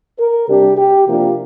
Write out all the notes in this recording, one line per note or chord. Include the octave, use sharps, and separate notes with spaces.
A#4
C3 G3 D4 G4
G4
C3 F3 A#3 D4 F4